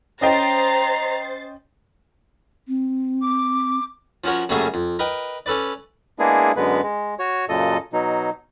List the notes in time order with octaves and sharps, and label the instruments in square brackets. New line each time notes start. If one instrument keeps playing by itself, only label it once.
[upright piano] C#4 D#5 G5 [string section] C5 A6 C7 [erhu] A#5
[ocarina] C4
[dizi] D6
[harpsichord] F3 C#4 F#4 A#4 C#5
F#2 C#3 G3 A3 A#3 G#4
F2
A#4 B4 D#5 G5
C#4 A4 B4 D5
[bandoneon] G#3 A#3 B3 D4 E4 G#4
F#2 D3 G#3 B3 B4
G#3
F#4 C#5
F#2 A#2 C#3 A4 D#5
B2 F#3 D#4